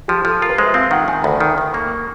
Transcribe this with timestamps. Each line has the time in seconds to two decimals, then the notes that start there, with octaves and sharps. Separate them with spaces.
0.08 F3 G4
0.25 F3 A4
0.41 F4 A#4
0.49 B4
0.58 G#3 C5
0.66 E5
0.74 C4 F5
0.91 D#3 F#5
1.08 D#3 G#5
1.24 D2 B5
1.40 D#3
1.58 D#3
1.74 A#3 C#6